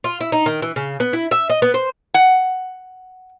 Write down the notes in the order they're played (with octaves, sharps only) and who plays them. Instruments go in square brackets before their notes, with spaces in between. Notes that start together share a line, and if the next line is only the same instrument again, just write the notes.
[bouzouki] F4
E4
D#4
D#3
E3
C#3
B3
E4
E5
D#5
B3
C5
[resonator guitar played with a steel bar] F#5